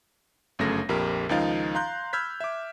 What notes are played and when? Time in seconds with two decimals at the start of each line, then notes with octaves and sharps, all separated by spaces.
0.59 G1 F#2 C#3 A3 A#6
0.89 A#1 F2 G4 A#4
1.29 C#2 D#3 F3 D#4 F5 A6
1.75 F5 A#5 C6 F#6 G6
2.13 B5 E6 F6 G6 G#6 B6
2.40 E5 D6